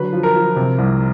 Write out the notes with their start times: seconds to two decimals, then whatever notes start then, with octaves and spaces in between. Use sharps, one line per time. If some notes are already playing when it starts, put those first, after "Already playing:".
Already playing: D3 F#3 B4
0.13 F3
0.23 A#4
0.35 F3
0.56 C3
0.78 C2